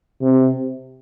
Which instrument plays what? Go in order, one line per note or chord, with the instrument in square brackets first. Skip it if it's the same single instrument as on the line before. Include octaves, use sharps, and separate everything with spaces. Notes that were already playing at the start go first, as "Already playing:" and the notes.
[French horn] C3